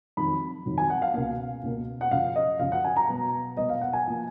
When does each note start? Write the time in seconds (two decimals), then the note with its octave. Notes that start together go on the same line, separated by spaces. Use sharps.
0.17 F2 D#3 F#3 B5
0.66 F2 D#3 F#3
0.78 G#5
0.90 F#5
1.02 F5
1.14 C#2 B2 A#3 F5
1.63 C#2 B2 A#3
2.01 F#5
2.11 F#2 C#3 F3 F5
2.36 D#5
2.59 F#2 C#3 F3 F5
2.72 F#5
2.85 G#5
2.96 A#5
3.08 B2 F#3 B3
3.56 B2 F#3 B3 D#5
3.69 F5
3.81 F#5
3.93 G#5
4.07 F3 A#3